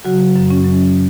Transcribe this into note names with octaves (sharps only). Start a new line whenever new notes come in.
C#3 F#3 F#4
F#2
C#4
F#3